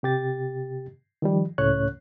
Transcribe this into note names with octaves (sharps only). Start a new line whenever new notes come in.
C3 G4 A6
D#3 F3 G3
C#2 A2 A3 C#4 C#5 F#6